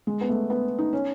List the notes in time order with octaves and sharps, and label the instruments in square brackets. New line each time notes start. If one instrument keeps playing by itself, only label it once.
[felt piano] G#3
B3
A3
B3
D#4
C#4